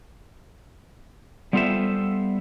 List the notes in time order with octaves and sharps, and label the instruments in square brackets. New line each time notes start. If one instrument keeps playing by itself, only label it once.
[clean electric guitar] G3 B3 F4 A4 C5 E5